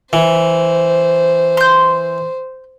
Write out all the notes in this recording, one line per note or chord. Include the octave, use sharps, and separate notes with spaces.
E3 C5
C6 G6